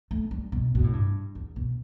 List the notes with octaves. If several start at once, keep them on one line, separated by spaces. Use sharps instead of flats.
A3
G3
B2
B2
A2
G2
E2
B2